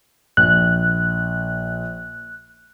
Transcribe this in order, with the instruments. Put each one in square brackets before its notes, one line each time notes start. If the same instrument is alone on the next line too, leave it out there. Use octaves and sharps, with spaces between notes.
[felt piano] A#1 [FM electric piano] F#6